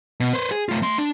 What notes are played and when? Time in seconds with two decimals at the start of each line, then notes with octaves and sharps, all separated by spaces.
0.20 B2
0.33 B4 C5
0.51 G#4
0.69 A3 F4
0.82 A3 C6
0.98 D4